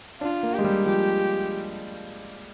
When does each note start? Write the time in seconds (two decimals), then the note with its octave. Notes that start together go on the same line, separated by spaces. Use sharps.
0.21 D4 F4
0.43 A#3
0.53 G4
0.59 G#3
0.64 G3
0.86 F3 G4